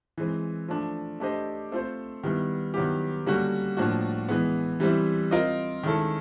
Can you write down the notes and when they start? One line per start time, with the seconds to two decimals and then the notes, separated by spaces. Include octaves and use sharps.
0.18 E3 G#3 C4
0.68 F3 A3 D4
1.20 A3 D4 G4 C5 D#5
1.72 A3 C4 F4 A4 C5
2.24 D#3 G3 B3 E4
2.74 D#3 F#3 B3 E4 G4
3.26 D3 G3 A#3 C#4 F#4
3.77 A2 F3 A#3 D4 F#4
4.28 E3 G#3 B3
4.80 E3 G3 C4 E4
5.31 C4 F4 A#4 D#5
5.83 D#3 G#3 C#4 E4 A4